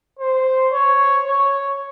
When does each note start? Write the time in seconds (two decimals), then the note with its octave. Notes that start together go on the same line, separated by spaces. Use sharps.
0.19 C5
0.74 C#5
1.28 C#5